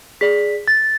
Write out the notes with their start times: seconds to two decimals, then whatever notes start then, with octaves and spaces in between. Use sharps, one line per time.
0.21 G#4 D5 B6
0.68 A6